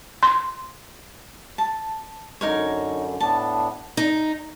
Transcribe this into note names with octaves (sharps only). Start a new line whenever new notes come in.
C6
A5
F#2 D3 D#4 A#4 C#5
A2 B3 D4 A5
D#4